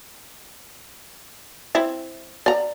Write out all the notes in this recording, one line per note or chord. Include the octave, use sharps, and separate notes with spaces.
C4 E4
D5 A#5